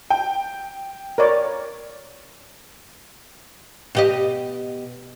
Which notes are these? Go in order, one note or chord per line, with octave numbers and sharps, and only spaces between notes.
G5
A#4 C#5 D5
B2 G4 D#5